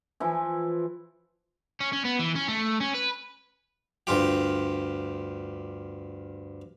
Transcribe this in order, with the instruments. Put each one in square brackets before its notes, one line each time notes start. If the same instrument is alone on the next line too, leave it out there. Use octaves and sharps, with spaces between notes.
[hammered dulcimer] E3 F3 E4
[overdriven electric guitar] C#4
C#4
B3
E3
C#4
A3
C#4
B4
[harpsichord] D2 G2 F4 G4